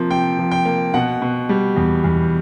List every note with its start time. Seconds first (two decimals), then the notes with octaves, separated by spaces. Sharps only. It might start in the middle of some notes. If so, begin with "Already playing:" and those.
Already playing: C3 F3 A#3
0.10 C3 G5
0.39 F3
0.51 G5
0.65 A#3
0.94 B2 F#5
1.22 B2
1.49 G3
1.76 E2
2.04 E2